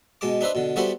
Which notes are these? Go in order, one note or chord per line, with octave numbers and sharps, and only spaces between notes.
B2 G#3 A5 D6
D4 D#4 B4 C5 E5
B2 D3
G3 B3 E4 F#4 A4 C5